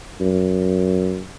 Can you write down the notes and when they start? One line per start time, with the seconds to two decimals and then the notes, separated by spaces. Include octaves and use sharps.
0.21 F#2